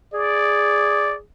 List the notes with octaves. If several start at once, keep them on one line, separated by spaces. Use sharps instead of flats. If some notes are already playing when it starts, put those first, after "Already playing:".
G#4 D5